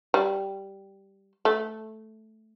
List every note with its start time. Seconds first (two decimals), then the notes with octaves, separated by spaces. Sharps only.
0.14 G3
1.45 A3